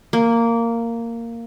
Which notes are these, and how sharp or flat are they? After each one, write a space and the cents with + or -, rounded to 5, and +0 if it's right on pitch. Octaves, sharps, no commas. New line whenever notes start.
A#3 -10